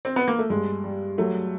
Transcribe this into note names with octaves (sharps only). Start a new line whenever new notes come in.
C4
B3
A#3
A3
G2 G#3
G3
F#3 A3